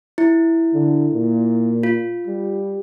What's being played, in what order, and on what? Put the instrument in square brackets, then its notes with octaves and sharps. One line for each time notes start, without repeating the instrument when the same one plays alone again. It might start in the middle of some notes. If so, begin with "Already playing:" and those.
[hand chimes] E4
[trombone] D3
A#2
[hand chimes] F4
[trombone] G3